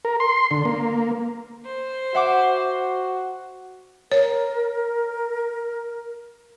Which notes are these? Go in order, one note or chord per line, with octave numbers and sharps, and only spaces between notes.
A#4
C6
D3
A#3
C5
F#4 E5 F#5 D6
A#4 C#5